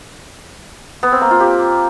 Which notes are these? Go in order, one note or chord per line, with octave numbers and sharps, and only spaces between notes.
B3
C4
A#3
F4
G4